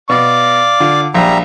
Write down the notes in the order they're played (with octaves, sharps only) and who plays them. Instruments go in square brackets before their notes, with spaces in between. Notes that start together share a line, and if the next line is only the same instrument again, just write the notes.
[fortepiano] B2 [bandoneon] D5 F5 [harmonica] D6
[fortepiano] D3 F4
[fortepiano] A#1 [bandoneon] G3 E5 A#5